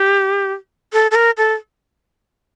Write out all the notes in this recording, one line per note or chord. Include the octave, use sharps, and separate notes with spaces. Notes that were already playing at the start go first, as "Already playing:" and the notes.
Already playing: G4
A4
A4
A#4
A4